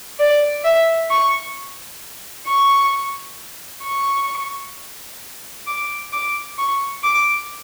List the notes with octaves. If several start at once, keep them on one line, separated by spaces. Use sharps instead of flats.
D5
E5
C#6
C#6
C#6
D6
D6
C#6
D6